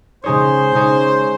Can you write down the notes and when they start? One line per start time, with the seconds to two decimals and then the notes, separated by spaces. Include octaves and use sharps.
0.24 C#3 G#3 D#4 G#4 C5 C#5
0.74 C#3 G#3 D#4 G#4 C#5